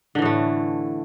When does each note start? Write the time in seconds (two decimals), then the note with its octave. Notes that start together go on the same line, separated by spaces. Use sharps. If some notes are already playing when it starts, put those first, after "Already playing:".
0.15 D3
0.19 E3
0.22 A2
0.25 A3